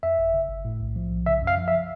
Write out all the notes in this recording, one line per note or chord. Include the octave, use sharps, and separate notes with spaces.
F2 E5
G1
C#3
G1
A2
B1
F3
B1
C#3 E5
F#2
F5
F3
E5